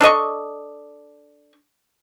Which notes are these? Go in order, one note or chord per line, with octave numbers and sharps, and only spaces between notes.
D4 A4 D#5 C#6